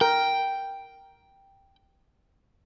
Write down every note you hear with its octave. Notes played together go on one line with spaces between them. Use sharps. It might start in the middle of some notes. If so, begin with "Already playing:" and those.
A#4 G5